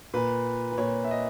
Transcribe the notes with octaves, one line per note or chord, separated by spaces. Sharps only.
A#2 B4
B4
A#2 C#5
E5
D#5